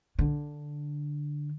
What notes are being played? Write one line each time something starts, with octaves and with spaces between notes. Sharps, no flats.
D3